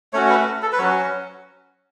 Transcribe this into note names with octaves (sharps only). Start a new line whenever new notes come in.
A3 C#4 F#4 C#5
B4
A4
B4
F#3 C#4 F#4 C#5